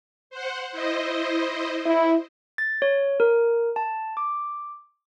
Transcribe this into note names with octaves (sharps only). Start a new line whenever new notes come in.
C5 F#5
E4 C5 D#5
E4
A6
C#5
A#4
A5
D6